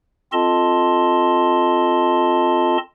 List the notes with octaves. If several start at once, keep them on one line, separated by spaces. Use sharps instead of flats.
C4 F4 A4 D#5 A5 C6